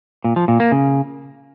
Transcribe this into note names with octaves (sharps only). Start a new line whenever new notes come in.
A#2
F3
A#2
A#3
C#3